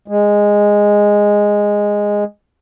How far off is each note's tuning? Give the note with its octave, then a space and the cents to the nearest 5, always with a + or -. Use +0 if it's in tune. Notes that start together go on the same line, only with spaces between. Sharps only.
G#3 -10